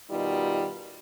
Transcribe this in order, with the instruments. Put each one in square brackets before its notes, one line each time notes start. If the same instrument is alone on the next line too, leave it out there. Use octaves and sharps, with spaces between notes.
[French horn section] B2 D#3 G3 D#4 F4